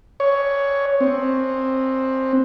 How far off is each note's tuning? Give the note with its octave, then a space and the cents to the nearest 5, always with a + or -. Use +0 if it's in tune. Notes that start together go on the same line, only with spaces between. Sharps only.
C#5 +10
C4 +10